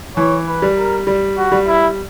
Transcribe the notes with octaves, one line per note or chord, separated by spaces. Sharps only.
E3 C#5
B4
G3
A#4
G3
F#4
G3
E4